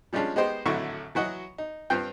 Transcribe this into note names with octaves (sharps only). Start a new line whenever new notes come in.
F3 G3 G#3 C#4 D4 F4
G#3 B3 D#4 G4 C5 D#5
G#1 A2 D3 F#3 C#6
E3 F#3 F#4 D#5
D#4
G2 C4 F4 G5